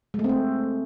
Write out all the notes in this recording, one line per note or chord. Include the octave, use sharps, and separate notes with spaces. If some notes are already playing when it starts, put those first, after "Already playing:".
G#3
A3
C4
A3